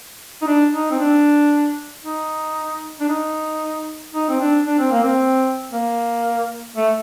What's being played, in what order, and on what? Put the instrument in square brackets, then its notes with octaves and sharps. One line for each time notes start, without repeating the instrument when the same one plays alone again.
[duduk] D#4
D4
D#4
C4
D4
D#4
D4
D#4
D#4
C4
D4
D4
C4
A#3
C4
A#3
A3